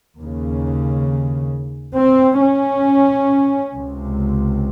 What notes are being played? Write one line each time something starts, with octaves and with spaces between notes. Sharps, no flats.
D#2 C#3
C4
C#4
C#2 C3